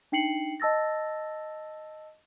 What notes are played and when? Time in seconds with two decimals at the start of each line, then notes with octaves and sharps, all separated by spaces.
0.12 D4 D#4 G5 C7 C#7 F#7
0.60 D#5 A5 E6 A6 A#6